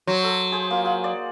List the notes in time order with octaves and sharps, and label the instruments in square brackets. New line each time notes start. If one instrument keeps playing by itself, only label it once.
[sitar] F#3 [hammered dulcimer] C5
[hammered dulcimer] A4
G#4 C5
A#3 F4
G#4 F#5
D5